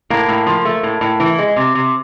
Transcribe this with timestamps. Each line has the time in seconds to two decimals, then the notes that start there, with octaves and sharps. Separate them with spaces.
0.10 A2 A#3
0.28 A2
0.47 F3
0.65 A3
0.83 A2
1.01 A2
1.20 E3
1.38 G#3
1.56 C3
1.75 C3